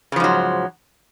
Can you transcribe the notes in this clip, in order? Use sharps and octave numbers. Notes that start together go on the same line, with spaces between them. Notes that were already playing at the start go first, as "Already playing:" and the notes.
G#2 C#3 F3 F#3